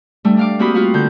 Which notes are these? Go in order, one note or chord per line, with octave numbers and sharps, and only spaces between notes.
G3 A3 D4
D4 F5 D6
A#3 C4 F#4 G4 B5 D#6
F4 F#4 F5
D3 G6